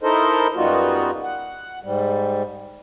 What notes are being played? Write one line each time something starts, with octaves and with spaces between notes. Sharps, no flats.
D#4 E4 A4 A#4 C5 D#5
F#2 G3 B3 D#4 F4 F#4
F#5
G#2 G3